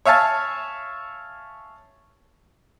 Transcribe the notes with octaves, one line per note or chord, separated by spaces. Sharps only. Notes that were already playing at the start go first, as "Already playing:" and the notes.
C#5 E5 F5 G#5 A5